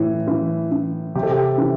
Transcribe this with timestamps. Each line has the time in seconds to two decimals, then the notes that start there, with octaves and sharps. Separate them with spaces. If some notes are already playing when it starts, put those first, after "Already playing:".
Already playing: A2 E3
0.28 E3
0.72 E3
1.15 C3 G4
1.23 A4
1.31 G4
1.58 E3